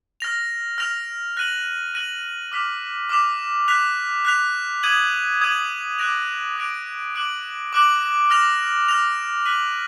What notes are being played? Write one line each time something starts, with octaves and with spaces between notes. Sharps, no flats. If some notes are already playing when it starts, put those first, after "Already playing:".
F6 A#6 F7
F6 A#6 F7
F#6 A#6 D#7 F#7
F#6 A#6 D#7 F#7
D6 F6 B6 F7
D6 F6 B6 F7
F#6 B6 F7
F#6 B6 F7
D#6 G#6 D#7 F#7
D#6 G#6 D#7 F#7
D6 F#6 A#6 D7 F7
D6 F#6 A#6 D7 F7
D6 F#6 D7 F#7
D6 F#6 D7 F#7
F6 A#6 F7
F6 A#6 F7
F#6 B6 D#7 F#7